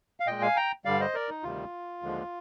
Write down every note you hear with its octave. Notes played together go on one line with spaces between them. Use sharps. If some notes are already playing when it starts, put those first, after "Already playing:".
F5
A#2 G#3 D#5 G5
F5 G#5
G5 A#5
G2 D3 G3 D5 F5
C5 D#5
A#4 D5
D#4
D2 C3 D#3 G3 F4
D#2 D3 F3 G#3